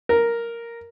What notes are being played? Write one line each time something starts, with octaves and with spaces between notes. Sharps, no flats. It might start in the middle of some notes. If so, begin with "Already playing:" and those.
A#4